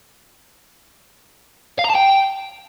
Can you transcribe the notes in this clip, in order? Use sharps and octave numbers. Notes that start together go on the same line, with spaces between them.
F5
A#5
A5
G5